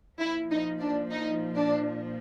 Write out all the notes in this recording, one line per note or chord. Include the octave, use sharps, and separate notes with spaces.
A#2 F3 E4
D#4
D4
D#4
D4